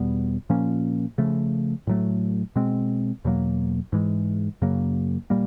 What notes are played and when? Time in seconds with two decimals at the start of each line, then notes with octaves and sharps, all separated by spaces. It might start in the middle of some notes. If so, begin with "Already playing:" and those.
Already playing: E2 B2 G3 B3
0.50 A#2 F3 A#3 C#4
1.18 C#3 F3 A3
1.87 A2 F#3 A3
2.56 B2 G#3 C4
3.25 E2 B2 F#3 A#3
3.92 G#2 E3 G#3
4.62 F#2 C#3 F#3 A#3
5.30 A#2 G3 A#3